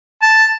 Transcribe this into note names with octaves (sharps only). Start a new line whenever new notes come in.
A5